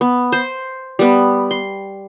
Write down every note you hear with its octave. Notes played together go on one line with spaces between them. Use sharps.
B3
C5
G3 B3
C6